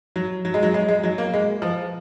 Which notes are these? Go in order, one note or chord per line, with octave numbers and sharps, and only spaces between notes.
F#3
F#3
G#3
F#3
G#3
G#3
F#3
A#3
G#3
F3